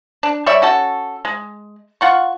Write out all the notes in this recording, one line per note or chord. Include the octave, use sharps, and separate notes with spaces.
D4
G3 C#5 D5 E5
C#4 F#4 A4
G#3
F4 F#5 C#6